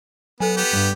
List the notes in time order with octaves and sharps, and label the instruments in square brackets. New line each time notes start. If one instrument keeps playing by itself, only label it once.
[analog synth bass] F#3 [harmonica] B3 [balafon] A4 G#5
[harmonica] B3 G4
[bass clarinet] G2 [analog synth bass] G3